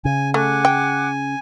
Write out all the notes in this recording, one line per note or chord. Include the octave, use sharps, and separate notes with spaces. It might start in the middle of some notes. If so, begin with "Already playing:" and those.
C#3 G#5
A3 F#5 G#5 D6 F#6
G5